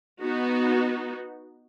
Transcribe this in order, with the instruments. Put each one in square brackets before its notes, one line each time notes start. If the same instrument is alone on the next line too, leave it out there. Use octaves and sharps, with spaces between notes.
[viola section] B3 D#4 F#4